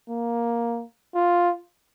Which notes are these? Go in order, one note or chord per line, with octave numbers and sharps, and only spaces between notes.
A#3
F4